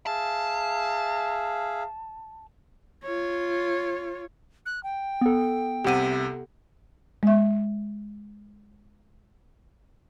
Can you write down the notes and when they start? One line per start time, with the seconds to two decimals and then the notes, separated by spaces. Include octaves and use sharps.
0.07 G#4 E5 F5 A5
3.04 F4 C#5
4.66 F#6
4.83 G5
5.21 B3 A4
5.85 C2 C3 G4 F#5 D#7
7.23 G#3 E5